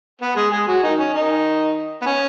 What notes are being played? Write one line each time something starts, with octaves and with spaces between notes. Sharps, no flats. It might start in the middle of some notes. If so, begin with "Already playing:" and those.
B3
G#3 G#4
G#3 G#4
F#3 F#4
D#3 D#4
C#4
D#3 D#4
B3
C#4